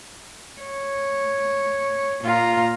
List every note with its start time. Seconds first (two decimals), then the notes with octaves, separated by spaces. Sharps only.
0.61 C#5
2.25 A#2 F4 A#5